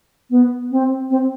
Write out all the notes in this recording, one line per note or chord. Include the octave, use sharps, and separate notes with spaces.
B3
C4
C4